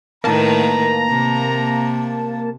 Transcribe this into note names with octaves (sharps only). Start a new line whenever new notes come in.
A2 D#3 A#3 B4 A5 A#5
C3